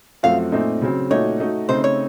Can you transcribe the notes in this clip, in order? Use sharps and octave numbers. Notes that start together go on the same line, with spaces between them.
F#2 F3 A3 C4 F#4 F5
A#2 A3 C4 D#4
C#3 F#3 C4
A#2 A3 D#4 F#4 C#5
A3 D#4 F#4
C#3 A3 C4 D#4 C5
C#5